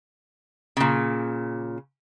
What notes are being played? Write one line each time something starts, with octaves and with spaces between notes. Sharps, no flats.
A#2 C#3